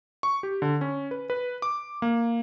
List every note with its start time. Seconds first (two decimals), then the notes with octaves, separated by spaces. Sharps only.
0.23 C#6
0.43 G4
0.62 D3
0.81 C#4
1.11 B4
1.30 B4
1.62 D6
2.02 A#3